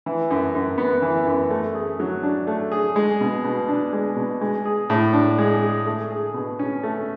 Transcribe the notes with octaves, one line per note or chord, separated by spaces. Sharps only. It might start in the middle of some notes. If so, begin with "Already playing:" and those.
E3
F#2
F#2
B3
E3
F#2
A3
G#4
F#3
D4
A3
G#4
G#3
B2
B2
D4
G#3
B2
G#3
G#4
A2
D4
G#3
G#4
A3
G#4
B2
C#4
A3